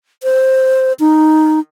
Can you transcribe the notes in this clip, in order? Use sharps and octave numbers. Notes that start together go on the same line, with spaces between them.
C5
D#4